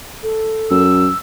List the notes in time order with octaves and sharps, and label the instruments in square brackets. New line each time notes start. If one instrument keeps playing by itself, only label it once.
[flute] A4
[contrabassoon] F#2 [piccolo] E6